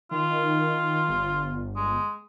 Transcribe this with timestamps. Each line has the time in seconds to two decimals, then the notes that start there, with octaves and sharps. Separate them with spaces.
0.11 D#3 F4
1.09 G1
1.76 G#3